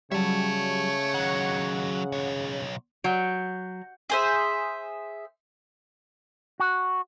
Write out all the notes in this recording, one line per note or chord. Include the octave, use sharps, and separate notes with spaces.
C#3 F#3 G3 C#5 E5 A5
D#3 F#3 F#5
B1 C#5
F#3 F#5 G6 D7
G#4 C5 E5
F#4